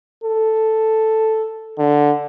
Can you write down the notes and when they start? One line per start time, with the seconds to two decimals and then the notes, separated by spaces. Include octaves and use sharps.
0.24 A4
1.78 D3